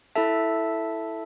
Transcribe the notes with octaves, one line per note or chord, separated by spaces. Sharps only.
E4 A4 E5 A5